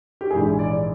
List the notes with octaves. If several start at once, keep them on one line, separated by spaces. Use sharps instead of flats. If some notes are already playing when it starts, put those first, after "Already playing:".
G4
A#1 G#2 E3 G#3 G#4
D5